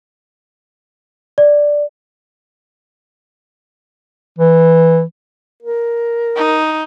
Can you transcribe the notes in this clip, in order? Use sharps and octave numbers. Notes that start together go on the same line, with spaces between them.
D5
E3
A#4
D#4